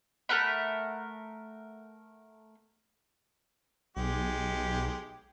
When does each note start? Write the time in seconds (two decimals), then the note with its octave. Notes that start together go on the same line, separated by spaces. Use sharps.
0.29 A3 A#4 F#5 B5
3.96 B1 G#3 G4